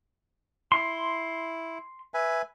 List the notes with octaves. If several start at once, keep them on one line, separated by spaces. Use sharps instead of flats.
E4 C6
B4 E5 G#5